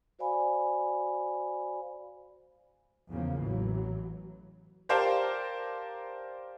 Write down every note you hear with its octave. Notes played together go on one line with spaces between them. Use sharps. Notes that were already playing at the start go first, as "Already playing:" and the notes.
F#4 C5 D5 F5 G#5 B5
E2 C#3 F3 A#3
A1 E3 F#3
G4 A#4 C5 D5 F5 A5